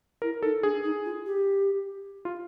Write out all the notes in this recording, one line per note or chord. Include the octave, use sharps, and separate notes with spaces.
E4 A#4
D#4 A4
D4 G#4
D#4
F4
G4
F4